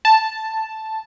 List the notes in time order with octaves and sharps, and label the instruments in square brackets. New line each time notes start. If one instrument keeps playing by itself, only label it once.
[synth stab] A5